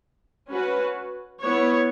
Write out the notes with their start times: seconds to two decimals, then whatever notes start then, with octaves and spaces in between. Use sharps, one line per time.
0.48 C#4 F#4 B4
1.42 B3 E4 C#5